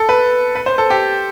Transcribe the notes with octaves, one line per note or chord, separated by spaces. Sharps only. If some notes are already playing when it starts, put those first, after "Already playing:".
Already playing: A4
B4
B4
C5
A4
G4